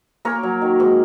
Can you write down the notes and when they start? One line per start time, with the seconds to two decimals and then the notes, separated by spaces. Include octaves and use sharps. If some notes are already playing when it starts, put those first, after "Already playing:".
0.25 A#3 A#4 C#5
0.43 F#3
0.62 D#3
0.80 G#2